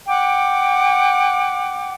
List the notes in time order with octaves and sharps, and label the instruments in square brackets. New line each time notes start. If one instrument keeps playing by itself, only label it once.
[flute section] F#5 G5 D6